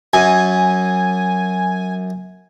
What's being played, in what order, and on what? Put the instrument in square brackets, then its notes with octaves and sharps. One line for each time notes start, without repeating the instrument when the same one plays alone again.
[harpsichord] F#2 [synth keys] G#5